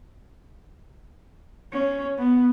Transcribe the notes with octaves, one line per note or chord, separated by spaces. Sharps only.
C#4
B3